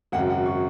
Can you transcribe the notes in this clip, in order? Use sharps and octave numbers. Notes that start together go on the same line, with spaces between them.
G#1 F#2 C#3 F#5
F#5
C#6